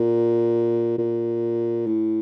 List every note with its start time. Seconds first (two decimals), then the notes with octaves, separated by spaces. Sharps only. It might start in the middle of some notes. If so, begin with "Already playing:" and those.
Already playing: A#2
0.98 A#2
1.87 A2